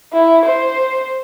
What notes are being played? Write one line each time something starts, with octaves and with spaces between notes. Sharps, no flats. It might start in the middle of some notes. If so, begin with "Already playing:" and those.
E4
C5